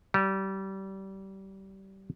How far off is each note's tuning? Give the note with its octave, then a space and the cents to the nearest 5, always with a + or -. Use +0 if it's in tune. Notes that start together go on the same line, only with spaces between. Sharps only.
G3 -25